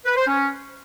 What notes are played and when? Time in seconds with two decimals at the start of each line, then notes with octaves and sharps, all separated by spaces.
0.05 B4
0.16 C5
0.27 C#4